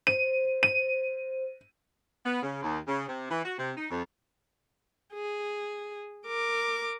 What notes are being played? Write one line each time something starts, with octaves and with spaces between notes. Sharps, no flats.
C5 D#7
D#7
B3
C#3
D#2
C#3
C3
E3
F#4
C3
D#4
F2
G#4
A#4 D6